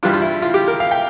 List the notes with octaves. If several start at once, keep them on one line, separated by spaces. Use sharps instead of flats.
G2 E3 G3 D4 F4
F4
E4
F4
G4
A#4
F5
G5